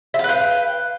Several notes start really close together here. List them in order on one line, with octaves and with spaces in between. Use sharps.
E5 F5 B4 G5